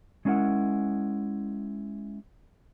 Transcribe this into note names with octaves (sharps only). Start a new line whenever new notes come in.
G#3 C#4 D4 E4 A#4 F#5